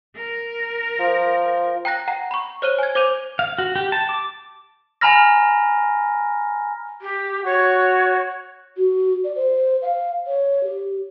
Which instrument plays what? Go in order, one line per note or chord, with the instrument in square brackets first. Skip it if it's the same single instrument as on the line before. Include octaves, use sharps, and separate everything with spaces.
[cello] A#4
[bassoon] F3
[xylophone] G5 A#5 F#6 A#6
F#5 A#5
B5 C#6
C5 C#5 F6 F#6 D#7 G7
G#5 G#6
C5 D6 G6 D#7 F7
[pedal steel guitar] F5
F#4
G4
A5
D6
[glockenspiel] G#5 A#5 B5 F6 A#6
[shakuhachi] G4
[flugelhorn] F#4 [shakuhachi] C#5
[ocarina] F#4
D5
C5
F5
C#5
G4